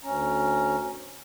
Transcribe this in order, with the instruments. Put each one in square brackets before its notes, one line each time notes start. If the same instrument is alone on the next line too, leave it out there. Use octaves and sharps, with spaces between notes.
[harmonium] D2 C#4 A#5